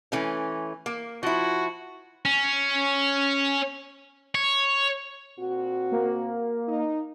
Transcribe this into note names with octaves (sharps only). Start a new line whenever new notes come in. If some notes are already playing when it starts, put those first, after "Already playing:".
E3 A3 C#4
A#3
F3 E4 F#4
C#4
C#5
A#2 C4 F#4
A#3
D#4